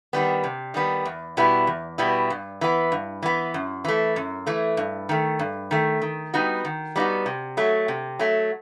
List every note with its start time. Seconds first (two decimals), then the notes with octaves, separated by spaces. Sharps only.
0.13 D#3 G3 B3
0.44 C3
0.74 D#3 G3 B3
1.05 E2
1.37 B2 G3 B3 E4
1.67 E2
1.98 B2 G3 B3 E4
2.30 G2
2.61 E3 B3
2.92 G2
3.22 E3 B3
3.54 F#2
3.85 E3 A3
4.16 F#2
4.47 E3 A3
4.77 G2
5.09 D#3 A3
5.39 G2
5.71 D#3 A3
6.02 D#3
6.34 G3 B3 D#4 F#4
6.65 D#3
6.96 G3 B3 D#4 F#4
7.26 C3
7.57 F#3 A3
7.88 C3
8.19 F#3 A3